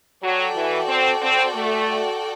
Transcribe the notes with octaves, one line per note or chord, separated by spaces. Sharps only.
F#3 F#4 A4 D5 G5
E3
C4
C4
A3